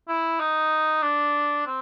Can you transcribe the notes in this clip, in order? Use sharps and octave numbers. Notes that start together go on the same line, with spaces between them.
E4
D#4
D4
C4